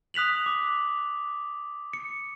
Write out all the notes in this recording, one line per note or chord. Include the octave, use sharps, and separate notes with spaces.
D#6 F#6 B6 F7 F#7
D6
C#7